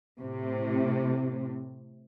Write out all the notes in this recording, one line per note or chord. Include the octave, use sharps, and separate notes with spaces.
A2 C3